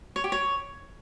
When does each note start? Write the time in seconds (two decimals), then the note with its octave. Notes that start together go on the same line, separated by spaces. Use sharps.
0.16 C#5
0.24 G4
0.32 C#5